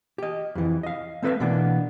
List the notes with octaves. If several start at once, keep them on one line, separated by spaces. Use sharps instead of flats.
G4 D#5
F2 E3
D#5 F5
A3 C4 A4 B4 E5 F5
B2 E3 A#3 B3 D4